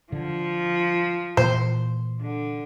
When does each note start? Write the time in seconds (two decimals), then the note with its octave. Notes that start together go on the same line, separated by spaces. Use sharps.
0.12 D3 F3
1.37 A#2 E3 A#3 C5
2.21 D3